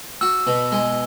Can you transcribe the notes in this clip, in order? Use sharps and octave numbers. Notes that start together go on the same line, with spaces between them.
F#4 E6
B2
G#3